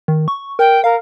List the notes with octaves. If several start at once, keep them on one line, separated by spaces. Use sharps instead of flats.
D#3
C#6
A#4 G5
A#4 F5